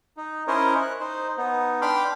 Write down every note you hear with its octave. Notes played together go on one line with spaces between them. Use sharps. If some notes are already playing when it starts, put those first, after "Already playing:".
D#4
C#4 E4 A#4 C5 C#5 D#5
F#6
D#4 C5
B3 D#4
D4 G5 B5 C6 D6 F6